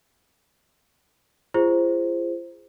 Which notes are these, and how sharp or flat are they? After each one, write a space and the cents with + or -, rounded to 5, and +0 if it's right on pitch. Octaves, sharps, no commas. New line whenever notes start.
F4 -35 G#4 -20 C5 +0